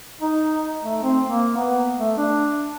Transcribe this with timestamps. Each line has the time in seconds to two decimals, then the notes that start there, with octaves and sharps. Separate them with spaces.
0.21 D#4
0.83 A3
1.03 C4
1.27 A#3
1.57 B3
1.98 A3
2.18 D4